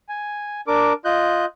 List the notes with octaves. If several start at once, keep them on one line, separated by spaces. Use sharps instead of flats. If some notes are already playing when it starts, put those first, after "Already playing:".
G#5
D4 A#4 D6
F4 D#5 F#6 G6